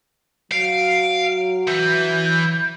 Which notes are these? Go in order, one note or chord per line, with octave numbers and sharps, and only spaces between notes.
F#3 F5 D7
E3 G6